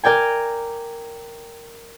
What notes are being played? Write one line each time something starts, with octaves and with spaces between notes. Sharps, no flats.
A#4 D5 G5 G#5